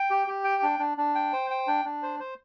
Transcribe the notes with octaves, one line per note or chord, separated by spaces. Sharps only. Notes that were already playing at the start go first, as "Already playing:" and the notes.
Already playing: G5
G4
G4
G5
D4
D4
D4
G5
C5
G5
D4
D4
C5
C5